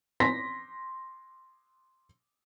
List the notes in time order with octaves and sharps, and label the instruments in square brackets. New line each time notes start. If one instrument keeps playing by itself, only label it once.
[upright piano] C6 A#6 B6